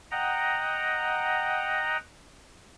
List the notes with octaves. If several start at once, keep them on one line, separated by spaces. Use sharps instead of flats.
D#5 F#5 G5 A#5